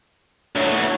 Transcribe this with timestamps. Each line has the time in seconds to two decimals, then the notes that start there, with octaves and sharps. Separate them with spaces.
0.55 D2 E3 C#5